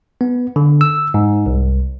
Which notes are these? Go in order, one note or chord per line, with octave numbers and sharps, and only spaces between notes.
B3
D3
E6
G#2
C2